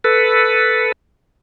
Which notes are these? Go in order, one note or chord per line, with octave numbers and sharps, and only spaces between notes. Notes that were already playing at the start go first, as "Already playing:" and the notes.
A4 B4